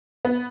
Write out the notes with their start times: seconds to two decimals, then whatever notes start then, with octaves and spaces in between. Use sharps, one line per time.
0.25 B3